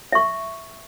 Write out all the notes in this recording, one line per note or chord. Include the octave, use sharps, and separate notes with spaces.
E5 C#6